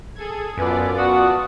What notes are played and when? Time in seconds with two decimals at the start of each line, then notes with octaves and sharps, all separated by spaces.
0.15 G#4 A4 G#6
0.57 F#2 B3 F4 A4 B4 D5 G#5
0.97 F#4 F#5 A5 D#6